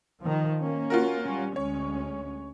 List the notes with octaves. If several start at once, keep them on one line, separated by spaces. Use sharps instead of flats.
D#3 F3
A#3 C#4
F4 F#4 A#4
G3 C#4
D2 G#3 C#4 C#5